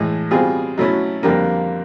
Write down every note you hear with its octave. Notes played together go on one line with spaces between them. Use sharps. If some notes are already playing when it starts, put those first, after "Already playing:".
Already playing: A2 E3 G#3
B2 G3 C4 F4 G#4
B2 F#3 A3 C#4 E4
F2 D3 G3 A#3